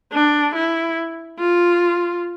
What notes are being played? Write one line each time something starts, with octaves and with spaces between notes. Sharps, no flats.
D4
E4
F4